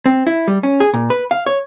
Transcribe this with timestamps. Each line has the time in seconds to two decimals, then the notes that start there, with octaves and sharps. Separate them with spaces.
0.06 C4
0.27 E4
0.48 G3
0.63 C#4
0.80 G#4
0.94 A#2
1.10 B4
1.31 F5
1.46 C#5